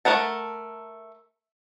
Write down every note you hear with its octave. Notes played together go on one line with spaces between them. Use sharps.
A3 A#4 F#5 A5